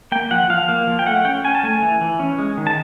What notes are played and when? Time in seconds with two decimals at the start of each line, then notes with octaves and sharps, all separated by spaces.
0.12 A#3 G5
0.31 F3 F#5
0.50 F3 F5
0.68 A#3
0.87 F3
0.99 G5
1.06 A3 F#5
1.25 C#4 G5
1.44 C#4 G#5
1.55 A5
1.63 A3 G#5
1.82 E3
2.01 E3
2.19 C#4
2.38 G#3
2.57 D#3
2.67 A5